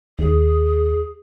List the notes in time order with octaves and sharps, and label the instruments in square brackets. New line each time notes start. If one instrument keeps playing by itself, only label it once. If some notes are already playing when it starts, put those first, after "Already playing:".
[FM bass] D#2 [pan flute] G#4